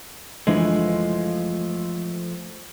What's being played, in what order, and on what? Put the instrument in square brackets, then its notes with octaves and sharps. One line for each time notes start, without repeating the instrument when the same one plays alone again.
[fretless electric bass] F#1 E3 D4 [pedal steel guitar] F3 A3 [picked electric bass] G#3